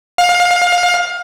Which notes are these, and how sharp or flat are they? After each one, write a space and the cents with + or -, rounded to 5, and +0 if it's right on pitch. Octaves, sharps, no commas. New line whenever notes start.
F5 +25